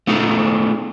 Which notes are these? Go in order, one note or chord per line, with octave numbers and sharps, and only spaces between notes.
A3 B3 D#4 G#4